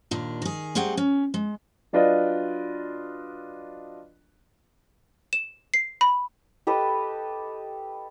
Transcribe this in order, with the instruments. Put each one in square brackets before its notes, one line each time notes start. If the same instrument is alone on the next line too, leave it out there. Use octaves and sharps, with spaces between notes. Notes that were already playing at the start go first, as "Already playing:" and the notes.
[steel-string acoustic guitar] D#2 A#2 D4
D#3 G#4
G3 A3 C4 G#4 F#5 G5
C#4
G#3
[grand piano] F#3 D4 F4 B4 D5 D#5
[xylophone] E7
C7
B5
[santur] G4 A4 B4 D#5